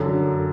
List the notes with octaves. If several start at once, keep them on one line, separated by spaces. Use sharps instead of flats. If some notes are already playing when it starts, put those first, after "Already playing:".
Already playing: F#2 D3